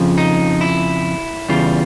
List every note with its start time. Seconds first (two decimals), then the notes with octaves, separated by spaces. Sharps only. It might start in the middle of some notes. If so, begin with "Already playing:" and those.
Already playing: F2 C#3 F3
0.18 D#4
0.61 E4
1.49 E2 C#3 E3 G3 F4